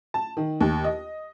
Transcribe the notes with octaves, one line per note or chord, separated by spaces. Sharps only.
A5
D#3
D#2
D#5